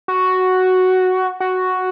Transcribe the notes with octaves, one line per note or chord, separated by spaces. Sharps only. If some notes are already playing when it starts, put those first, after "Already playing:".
F#4
F#4